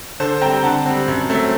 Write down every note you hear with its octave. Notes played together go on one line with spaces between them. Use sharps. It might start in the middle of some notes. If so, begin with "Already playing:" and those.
D3 A4 C5
G3 C4 G5 A#5
D3 F#5 A5
G3 C4
F#2
F#3 A3 C4